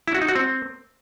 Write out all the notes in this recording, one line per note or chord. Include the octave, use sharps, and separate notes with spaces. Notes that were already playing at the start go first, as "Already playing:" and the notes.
E4
F#4
D#4
F#4
C4